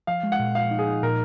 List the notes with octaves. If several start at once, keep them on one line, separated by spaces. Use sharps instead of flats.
F3 F5
G#3
F#5
A#2
F3 F5
D#4
G#4
D#4
A#2 A#4